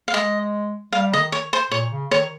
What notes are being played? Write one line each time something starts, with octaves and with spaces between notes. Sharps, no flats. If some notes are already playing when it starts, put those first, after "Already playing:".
F5
G#3 D#5
G3 F5
C#3 D#5
D#3
C#5
C5
A#2 C#5
C#3
D#3 C#5